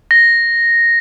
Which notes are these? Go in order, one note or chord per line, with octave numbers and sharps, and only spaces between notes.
A#6